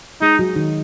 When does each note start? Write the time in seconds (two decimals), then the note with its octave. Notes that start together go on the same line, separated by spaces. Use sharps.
0.21 G#3 D#4 G#4
0.39 F#3 F#4
0.56 D#3 D#4